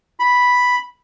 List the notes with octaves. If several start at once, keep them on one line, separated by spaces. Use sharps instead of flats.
B5